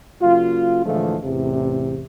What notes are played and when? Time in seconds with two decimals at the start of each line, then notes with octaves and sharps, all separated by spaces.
0.22 C#3 F#3 A#3 F4
0.85 A2 D3 E3 F3 G#3 A3
1.24 A1 E2 C3